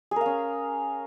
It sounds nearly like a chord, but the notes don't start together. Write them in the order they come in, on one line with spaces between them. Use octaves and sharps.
G#4 A#4 F5 C#4